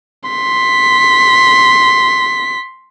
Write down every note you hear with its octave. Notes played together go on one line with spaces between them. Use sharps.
C6 B6